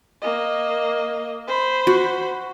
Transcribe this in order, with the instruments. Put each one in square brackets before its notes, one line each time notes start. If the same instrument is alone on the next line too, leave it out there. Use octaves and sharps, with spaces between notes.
[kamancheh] A#3 D#5
C5 B5
[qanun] F#4